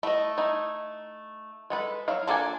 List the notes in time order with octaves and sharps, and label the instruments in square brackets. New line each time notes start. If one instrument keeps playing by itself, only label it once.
[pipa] A3 [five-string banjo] E4 D#5
[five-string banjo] D#4 E4
G#3 A4 B4
F#3 E4 F5
[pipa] A#3 D4 [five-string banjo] F4 A4 G#5